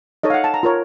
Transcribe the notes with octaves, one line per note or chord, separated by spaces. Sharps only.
D#4 A4 C#5 D#5
F5
F#5
A5
A#5
F4 A#4 C#5